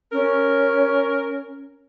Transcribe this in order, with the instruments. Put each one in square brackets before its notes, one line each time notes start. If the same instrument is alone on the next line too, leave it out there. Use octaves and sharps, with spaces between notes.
[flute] C#4 [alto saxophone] A#4